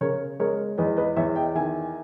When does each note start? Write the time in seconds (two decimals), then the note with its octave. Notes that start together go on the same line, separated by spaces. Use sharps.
0.01 C#3 A#4 C#5
0.39 G#3 A#4 C#5
0.78 E2 B4 D#5
0.97 B4 D#5
1.16 E2 C#5 E5
1.36 D#5 G5
1.55 D#3 E5 G#5